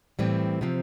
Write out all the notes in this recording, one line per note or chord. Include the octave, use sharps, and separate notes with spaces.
A2 E3 G3 C4
C3 F3 C4